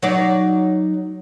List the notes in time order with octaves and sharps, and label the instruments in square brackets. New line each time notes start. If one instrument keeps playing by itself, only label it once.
[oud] F#3 D#4 D5